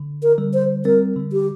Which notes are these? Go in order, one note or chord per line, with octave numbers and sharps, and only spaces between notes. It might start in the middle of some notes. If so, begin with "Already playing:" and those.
Already playing: D3
A#4
D3 G3
C5
G3 C4 A#4
D3 G3
G4